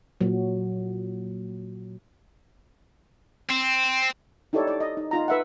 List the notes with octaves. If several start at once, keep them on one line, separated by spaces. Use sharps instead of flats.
A#2 F#3
C4
D#4 E4 G4 A4 C#5 D5
D5
D#5
D#4
D#4 F4 A#5
B4 E5 F#5